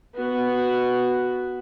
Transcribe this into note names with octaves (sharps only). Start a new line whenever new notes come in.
B3 F#4